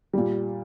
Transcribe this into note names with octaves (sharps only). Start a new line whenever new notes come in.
A#2 G3